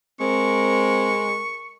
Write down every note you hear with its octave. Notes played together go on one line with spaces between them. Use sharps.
G#3 C4 A#4 C#6